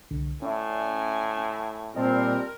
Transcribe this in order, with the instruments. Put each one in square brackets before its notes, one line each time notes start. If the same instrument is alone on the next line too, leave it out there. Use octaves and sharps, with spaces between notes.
[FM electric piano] C2 D3
[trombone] A2 [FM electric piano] C#4 D5 E5 [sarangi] G#5
[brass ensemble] A#2 G3 C4 [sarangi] A#4 [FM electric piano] D#5 A5 C6